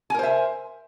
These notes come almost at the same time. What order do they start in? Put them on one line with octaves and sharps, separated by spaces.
G#5 A#4 C5 E5